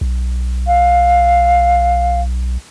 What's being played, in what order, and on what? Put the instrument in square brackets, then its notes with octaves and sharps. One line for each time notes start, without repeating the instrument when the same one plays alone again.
[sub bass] B1
[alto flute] F5